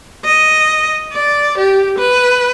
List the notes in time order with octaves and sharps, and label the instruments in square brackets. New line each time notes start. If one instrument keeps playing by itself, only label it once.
[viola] D#5
D5
G4
B4